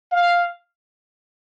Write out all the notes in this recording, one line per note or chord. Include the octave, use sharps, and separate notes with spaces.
F5